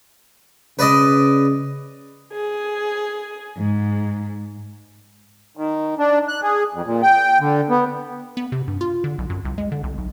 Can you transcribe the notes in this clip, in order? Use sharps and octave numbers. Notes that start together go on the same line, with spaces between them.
C#3 B4 D5 D#5
G#4
G#2
D#3
D4
F#6
G#4
F2
A#2
G5
D3
B3
B3
C3
G2
F4
D3
B1
F#2
C2
G#3
D3
C2
B1